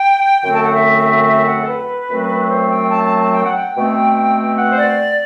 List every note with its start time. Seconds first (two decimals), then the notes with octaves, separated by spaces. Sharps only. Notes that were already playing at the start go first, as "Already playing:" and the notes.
Already playing: G5
0.43 F#2 D3 A3 C4 G5
0.54 A5
0.64 F#5
0.75 E5
1.26 E5
1.47 F#5
1.61 A4
1.67 B4
2.09 F#2 F#3 A3 C4
2.50 C5
2.70 G5
2.91 A5
3.05 A5
3.19 A5
3.33 G5
3.44 F#5
3.56 G5
3.75 B2 A3 C4
4.57 F#5
4.70 C5
4.78 D5